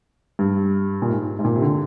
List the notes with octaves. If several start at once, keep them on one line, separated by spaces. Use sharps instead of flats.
G2
A#2
G#2
G#2
A#2
C3
D3